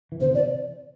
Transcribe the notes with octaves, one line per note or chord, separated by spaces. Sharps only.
E3
B2 D3 C5
C3 E3
D5